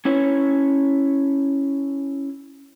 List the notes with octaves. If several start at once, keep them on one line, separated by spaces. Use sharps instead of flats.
C#4 E4 C#5